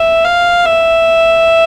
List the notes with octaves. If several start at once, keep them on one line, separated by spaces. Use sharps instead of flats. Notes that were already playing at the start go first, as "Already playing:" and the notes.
Already playing: E5
F5
E5